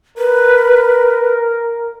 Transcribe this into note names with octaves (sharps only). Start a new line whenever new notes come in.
A#4 B4